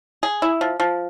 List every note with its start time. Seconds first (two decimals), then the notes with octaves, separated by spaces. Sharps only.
0.23 G#4
0.42 E4
0.61 F3
0.80 F3